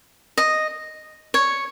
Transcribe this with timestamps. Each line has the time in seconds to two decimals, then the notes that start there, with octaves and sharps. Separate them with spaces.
0.38 D#5
1.34 C#5